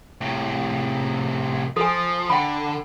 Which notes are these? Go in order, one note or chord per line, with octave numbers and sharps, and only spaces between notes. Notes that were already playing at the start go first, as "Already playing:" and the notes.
A2 C3
F3 A4 G#5
D3 F#5 G5 B5